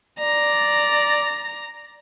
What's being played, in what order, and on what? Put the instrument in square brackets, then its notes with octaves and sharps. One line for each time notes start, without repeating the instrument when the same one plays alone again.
[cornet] D5 [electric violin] A#5